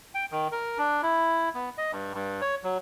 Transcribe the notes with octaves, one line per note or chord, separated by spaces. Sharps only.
G5
D#3
A#4
D4
E4
B3
D#5
G2
G2
C#5
F#3